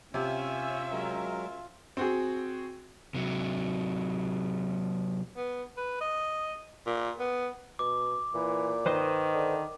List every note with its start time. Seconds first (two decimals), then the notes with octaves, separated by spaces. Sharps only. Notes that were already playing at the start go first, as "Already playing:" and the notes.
0.14 C3 C#4 F4 E5 G#5
0.92 F#3 G#3 A#4
1.97 C4 F#4 G#4
3.14 C3 F#3
5.37 B3
5.77 B4
6.01 D#5
6.86 A#2
7.19 B3
7.79 B2 D6
8.34 A#2 E3
8.86 D#3 B4 C5 D#5
9.34 D3